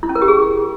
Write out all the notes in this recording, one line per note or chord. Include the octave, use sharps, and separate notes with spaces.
E4
C#4
A#4
G4
G#4